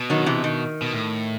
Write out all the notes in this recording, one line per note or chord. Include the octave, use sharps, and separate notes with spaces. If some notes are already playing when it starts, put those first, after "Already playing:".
Already playing: B2
D#3 F#3
C3 E3
D#3
B2
A2